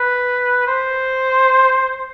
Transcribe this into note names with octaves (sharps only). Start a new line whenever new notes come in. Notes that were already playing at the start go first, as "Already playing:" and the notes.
Already playing: B4
C5